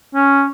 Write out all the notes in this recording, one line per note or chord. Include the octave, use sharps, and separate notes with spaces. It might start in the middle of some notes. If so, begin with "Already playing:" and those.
C#4